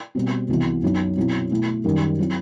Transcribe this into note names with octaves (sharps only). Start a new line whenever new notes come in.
B2 G3 C4
C2 C3 E3 B3 F#4
F#2 F#3 B3 D#4
B2 F#3 C4 E4
B2 A3 E4
F#2 D#3 G3 D#4
F#3 C4 E4